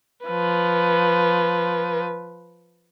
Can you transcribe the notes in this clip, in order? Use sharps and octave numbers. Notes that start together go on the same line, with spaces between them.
F3 B4